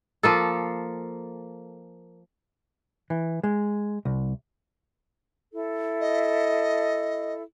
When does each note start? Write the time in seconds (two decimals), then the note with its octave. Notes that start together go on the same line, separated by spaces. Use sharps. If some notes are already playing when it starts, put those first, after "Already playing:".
0.23 F3 A#3 A4
3.10 E3
3.43 G#3
4.05 C2
5.52 E4 A4
6.01 D#5